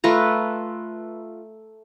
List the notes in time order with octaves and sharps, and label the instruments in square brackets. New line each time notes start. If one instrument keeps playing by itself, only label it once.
[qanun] A3 F4 B4 A#5